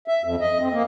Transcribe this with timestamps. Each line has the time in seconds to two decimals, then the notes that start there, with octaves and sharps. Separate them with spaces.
0.08 E5
0.24 F2
0.41 D#5
0.60 C4
0.72 A#3